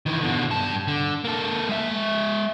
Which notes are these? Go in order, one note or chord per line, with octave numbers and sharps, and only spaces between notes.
D#3 E3
B2 D3
G2 A5
D3
A#3 A4
G#3 E5